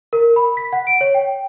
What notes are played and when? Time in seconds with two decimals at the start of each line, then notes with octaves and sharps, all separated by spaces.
0.13 A#4
0.36 B5
0.57 B6
0.73 F#5
0.87 D7
1.01 C#5
1.15 G5